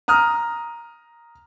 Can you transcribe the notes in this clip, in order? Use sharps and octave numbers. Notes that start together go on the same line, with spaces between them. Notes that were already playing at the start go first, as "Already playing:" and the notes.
A#5 D#6 F6